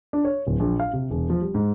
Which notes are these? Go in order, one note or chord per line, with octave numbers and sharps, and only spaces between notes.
D4
C#5
D1
A#1
F5
C3
E1
F3
G3
G#2